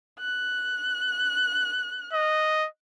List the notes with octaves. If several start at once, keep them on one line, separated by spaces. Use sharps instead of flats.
F#6
D#5